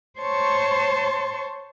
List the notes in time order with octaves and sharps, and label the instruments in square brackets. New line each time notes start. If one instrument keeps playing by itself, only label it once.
[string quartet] C5 C#5 A5 C6 C#6